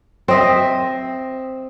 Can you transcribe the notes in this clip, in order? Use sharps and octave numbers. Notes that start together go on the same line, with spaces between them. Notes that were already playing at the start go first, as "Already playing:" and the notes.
C4 D#5 E5